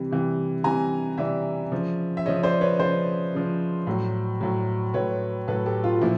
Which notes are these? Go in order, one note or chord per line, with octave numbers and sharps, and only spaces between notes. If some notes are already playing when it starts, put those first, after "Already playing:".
Already playing: C3 E3 G3
C3 E3 G3
C3 E3 G3 G#5 A#5
C3 E3 G3 D5 E5
C#3 F3
E5
C#3 F3 C#5 D#5
C5 D5
B4 C#5
C#3 F3 C5 D5
C#3 F3
A2 F#3
A2 F#3
A2 F#3 B4 C#5
A2 F#3 A4 B4
G4 A4
F4
A#2 F3 E4